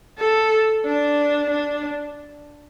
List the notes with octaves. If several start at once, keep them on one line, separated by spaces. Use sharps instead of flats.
A4
D4
D4